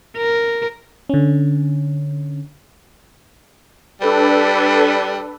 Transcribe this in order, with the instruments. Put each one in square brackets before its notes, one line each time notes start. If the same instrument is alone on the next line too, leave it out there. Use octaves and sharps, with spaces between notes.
[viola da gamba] A#4
[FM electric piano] D3 C#4
[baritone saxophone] G3 [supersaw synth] D4 A4 B4